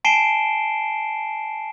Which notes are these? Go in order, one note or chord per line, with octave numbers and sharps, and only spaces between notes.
G#5 A5 C7 D7 E7 G7